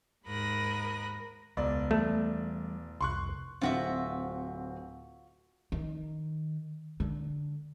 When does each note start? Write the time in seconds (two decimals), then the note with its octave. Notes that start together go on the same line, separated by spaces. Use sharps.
0.25 D#2 G#2 A#4 B5 D#6 F#6
1.57 E1 C#2 G#3 D5
1.91 E3 G3 A3
3.01 F1 C2 C6 C#6 F#6
3.61 D1 C4 F4 F#4 E5
5.72 D#3
7.00 D3